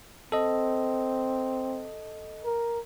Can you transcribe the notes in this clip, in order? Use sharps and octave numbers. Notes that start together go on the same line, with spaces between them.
C4 A4 D#5
A#4